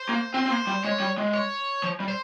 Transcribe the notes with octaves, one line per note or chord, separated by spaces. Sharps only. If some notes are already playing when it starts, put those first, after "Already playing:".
Already playing: C5
A#3
C4 C5
C4
A#3
G3
G#3 C#5
G3
G#3
C#5
F3
G3
C5